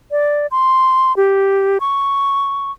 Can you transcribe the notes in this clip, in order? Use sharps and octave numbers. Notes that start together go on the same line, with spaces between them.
D5
C6
G4
C#6